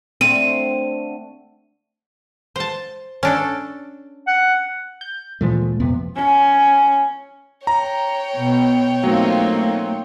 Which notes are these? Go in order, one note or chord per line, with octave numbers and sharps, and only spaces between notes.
D3 A3 C4 D#7
C5 A5
C#4 D4 A4
F#5
G6
D2 A#2 E3 F3 G#3 A3
F2 C3 B3
C#4
C#5 G5 A#5
B2
F#3 A3 A#3 C4 D#4 F4